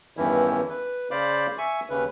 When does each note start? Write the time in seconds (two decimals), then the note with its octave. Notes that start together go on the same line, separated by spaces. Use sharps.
0.17 E2 G2 D#3 E3 C#4 E4
0.70 B4
1.11 C#3 C5 D5 F5 B5 D6
1.58 E5 G#5 C#6
1.90 D#2 C#3 C#4 B4